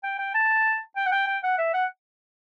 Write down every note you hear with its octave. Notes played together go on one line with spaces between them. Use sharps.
G5
G5
A5
G5
F#5
G5
G5
F#5
E5
F#5